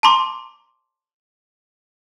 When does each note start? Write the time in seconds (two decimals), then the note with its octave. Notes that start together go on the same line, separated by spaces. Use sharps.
0.03 A5 A#5 C6 D6